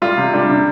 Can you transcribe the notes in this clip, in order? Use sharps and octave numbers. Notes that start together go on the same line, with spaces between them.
G3 F4
C3
G3 D4
C3